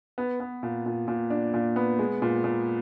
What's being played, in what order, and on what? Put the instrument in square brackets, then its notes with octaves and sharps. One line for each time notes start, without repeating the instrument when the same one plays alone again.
[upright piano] B3
B3
A#2
A#2
A#2
D4
A#2
B3
G#3
A#2
A#2